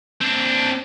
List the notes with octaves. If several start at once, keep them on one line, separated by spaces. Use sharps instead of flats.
C4 D4